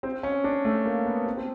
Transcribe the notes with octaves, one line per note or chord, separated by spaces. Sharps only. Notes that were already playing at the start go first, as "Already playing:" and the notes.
C4
C#4
D4
A3
A#3
B3
C4
C4